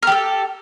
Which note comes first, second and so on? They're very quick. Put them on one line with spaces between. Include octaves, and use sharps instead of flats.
A#4 G4 A4